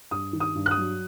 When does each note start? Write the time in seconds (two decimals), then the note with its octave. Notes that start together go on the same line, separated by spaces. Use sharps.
0.11 G2 D#6
0.33 D#3
0.40 D#6
0.55 G2
0.66 F#6
0.71 D#6
0.78 F#3